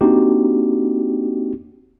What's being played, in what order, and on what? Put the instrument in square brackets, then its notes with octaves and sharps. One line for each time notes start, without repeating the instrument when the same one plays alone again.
[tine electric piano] A#3 C4 D4 D#4 F#4 G4